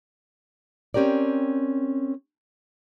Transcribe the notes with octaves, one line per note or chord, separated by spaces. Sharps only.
C4 C#4 G4 A#4 D5